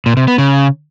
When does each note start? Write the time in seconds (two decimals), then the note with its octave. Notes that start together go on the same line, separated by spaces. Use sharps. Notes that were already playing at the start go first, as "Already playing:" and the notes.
0.06 A#2
0.17 C3
0.28 B3
0.38 C#3